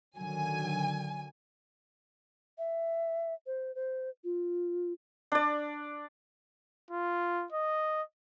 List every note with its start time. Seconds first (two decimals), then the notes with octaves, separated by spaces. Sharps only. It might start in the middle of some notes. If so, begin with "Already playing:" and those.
0.19 D3 D#3 F#3 G#5
2.58 E5
3.47 C5
3.75 C5
4.24 F4
5.32 D4 D5
6.90 F4
7.52 D#5